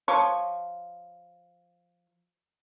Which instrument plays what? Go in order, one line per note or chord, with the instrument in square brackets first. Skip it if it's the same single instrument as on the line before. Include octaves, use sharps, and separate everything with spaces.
[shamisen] F3 C#5